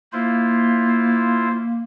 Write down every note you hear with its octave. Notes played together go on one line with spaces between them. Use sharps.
A#3 E4 F4 C5